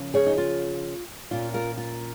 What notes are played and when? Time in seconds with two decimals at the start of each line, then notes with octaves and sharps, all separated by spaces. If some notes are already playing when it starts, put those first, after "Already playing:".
Already playing: C#3 F3 A#3 C#4
0.14 G#4 C#5
0.26 D#4
0.37 F4
1.31 A#2 A#3 C#4 F4
1.54 F4 A#4
1.77 F4